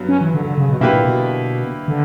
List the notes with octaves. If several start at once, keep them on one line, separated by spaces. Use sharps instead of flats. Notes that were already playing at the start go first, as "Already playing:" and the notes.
Already playing: G2 F#3 B3
C#4
E3
D3
D3
C#3
B2
B2 D3 A#3 E4 G4 B4
A#2
B2
D3